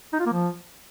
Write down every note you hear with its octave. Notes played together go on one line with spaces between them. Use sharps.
D#4
F4
A#3
F3